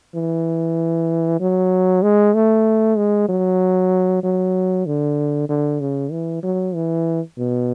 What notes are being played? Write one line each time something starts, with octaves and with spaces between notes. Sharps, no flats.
E3
F#3
G#3
A3
G#3
F#3
F#3
D3
D3
C#3
E3
F#3
E3
B2